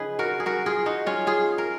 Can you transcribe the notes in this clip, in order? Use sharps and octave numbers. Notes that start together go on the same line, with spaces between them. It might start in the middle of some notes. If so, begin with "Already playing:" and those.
Already playing: C#3 F3 D#4 G#4 B4
F#4 A#4
G#4
F#4 A#4
F4 G#4
D#4 F#4
C#4 F4
F4 G#4
A#4